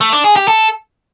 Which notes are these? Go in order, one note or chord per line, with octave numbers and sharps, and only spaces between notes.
A3
D4
G#4
G4
A4